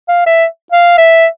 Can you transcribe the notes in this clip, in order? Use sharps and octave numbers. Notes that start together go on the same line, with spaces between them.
F5
E5
F5
E5